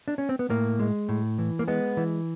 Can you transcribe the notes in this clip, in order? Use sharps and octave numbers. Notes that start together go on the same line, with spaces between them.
D4
C#4
C4
B3
A2 A#3
G#3
A2
E3
A#3
G#3 B3
E3